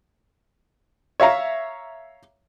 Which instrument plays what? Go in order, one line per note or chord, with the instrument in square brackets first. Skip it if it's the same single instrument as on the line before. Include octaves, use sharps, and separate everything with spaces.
[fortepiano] C#5 E5 F5 A#5